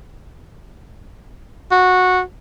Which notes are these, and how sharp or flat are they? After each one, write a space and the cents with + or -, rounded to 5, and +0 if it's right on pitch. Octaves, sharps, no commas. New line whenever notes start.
F#4 -15